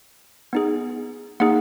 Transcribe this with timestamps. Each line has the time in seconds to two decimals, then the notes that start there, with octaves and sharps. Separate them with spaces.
0.53 B3 D#4 G#4
1.40 A#3 D#4 G#4 F#5